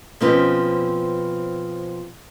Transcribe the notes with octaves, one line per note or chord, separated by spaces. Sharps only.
B2 F3 C4 C#4 B4